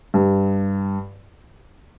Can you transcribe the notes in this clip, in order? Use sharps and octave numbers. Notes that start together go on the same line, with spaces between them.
G2